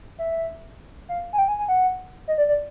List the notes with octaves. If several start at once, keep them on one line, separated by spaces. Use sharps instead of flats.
E5
F5
G#5
G5
G#5
G#5
F#5
D#5
D5
D5